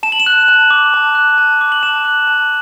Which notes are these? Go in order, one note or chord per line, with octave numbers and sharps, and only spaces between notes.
A5 E7
F#7
E7
F#6
A5
D6
A5
F#6
A5
D6
F#7
A5 E7
F#6
A5